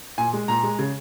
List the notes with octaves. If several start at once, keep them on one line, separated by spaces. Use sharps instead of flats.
A#2 G#5
G#3
A#2 A#5
G#3
C#3